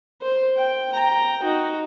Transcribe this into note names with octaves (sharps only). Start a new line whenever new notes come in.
C5
G5
G5 A#5
D#4 F#4